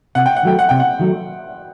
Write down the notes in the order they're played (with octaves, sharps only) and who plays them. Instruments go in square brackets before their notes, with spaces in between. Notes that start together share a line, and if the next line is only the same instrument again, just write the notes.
[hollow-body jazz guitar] C3 [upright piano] F#5
[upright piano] G5
F#5
[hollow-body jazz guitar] D#3 F#3 A3 [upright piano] G5
[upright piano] F#5
[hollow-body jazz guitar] C3 [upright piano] G5
[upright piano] F#5
[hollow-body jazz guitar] D#3 F#3 A3